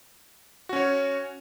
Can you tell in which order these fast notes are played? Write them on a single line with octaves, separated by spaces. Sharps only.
F#4 C#4 C#5